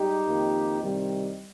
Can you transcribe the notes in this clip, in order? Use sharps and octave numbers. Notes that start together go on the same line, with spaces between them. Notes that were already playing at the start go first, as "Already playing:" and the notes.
Already playing: G#2 G3 D#4 G4
F2 D#3 A#3
C2 C3 D#3 G3